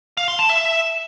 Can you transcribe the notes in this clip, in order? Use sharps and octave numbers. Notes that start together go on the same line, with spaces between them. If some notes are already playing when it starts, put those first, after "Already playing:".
F5
C6
A5
E5